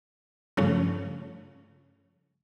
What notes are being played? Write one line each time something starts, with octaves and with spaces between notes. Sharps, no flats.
G2 C#3 F3 A3 C#4